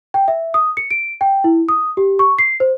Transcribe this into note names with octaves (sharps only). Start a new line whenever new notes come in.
G5
E5
D#6
C#7
D7
G5
E4
D#6
G4
C#6
C7
C5